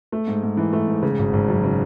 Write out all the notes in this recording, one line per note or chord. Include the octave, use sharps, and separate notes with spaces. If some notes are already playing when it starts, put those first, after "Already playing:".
A3
G#2
G#2
E3
A3
G#2
C#3
G#1
G#1
F#2
C#3